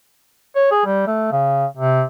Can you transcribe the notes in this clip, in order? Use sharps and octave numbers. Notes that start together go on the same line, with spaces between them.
C#5
G#4
G3
A3
C#3
C3